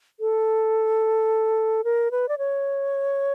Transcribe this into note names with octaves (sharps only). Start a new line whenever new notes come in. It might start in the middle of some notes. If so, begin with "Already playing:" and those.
A4
A#4
B4
D5
C#5